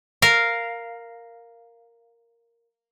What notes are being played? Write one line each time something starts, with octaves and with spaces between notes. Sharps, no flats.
A#4 F5